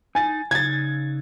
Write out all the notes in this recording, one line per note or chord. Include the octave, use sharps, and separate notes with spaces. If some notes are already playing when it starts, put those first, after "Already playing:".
D#4 G#5 A6
C#3 D#4 G#6 A6